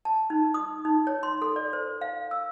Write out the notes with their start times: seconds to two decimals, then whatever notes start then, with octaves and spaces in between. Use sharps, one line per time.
0.05 A5
0.30 D#4
0.54 D#6
0.85 D#4
1.07 C#5
1.23 C6
1.42 A4
1.56 D5
1.73 C5
2.01 F5
2.31 E6